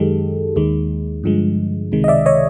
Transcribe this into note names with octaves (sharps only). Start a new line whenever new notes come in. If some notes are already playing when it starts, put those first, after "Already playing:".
Already playing: F#2 D#3 G#3 G4 A4
D#2 D#3 G#3
G2 D3 F3 G#3
C#2 C3 D#3 G#3
D#5
D5 E5
C#5 D#5